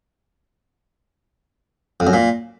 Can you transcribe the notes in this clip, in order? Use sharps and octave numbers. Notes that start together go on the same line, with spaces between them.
F2
F#2
A#2